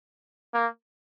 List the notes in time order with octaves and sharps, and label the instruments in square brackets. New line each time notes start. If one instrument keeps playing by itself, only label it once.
[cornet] A#3